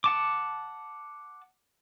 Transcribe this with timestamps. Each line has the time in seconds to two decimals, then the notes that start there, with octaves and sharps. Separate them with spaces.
0.04 F#5 A5 D6